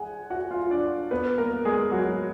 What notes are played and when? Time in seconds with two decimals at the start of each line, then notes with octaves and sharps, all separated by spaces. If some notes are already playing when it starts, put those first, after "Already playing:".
Already playing: G#4 F#5 G#5
0.30 F#4 F#5
0.51 F4 F5
0.70 D4 D5
1.11 B3 B4
1.38 A#3 A#4
1.65 G#3 G#4
1.92 F#3 F#4